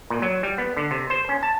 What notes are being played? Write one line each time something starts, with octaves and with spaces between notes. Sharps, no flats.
A#2
F#3
G3
B3
D3
C3
C5
C#4
A5